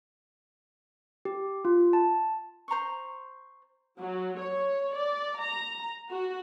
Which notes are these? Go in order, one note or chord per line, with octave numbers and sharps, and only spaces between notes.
G4
F4
A5
C5 A#5 C6 C#6
F#3
C#5
D5
A#5
F#4